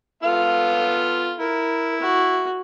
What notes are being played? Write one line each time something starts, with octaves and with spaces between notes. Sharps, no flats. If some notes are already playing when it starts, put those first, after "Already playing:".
B3 F4 A4 F5
E4 A#4
F#4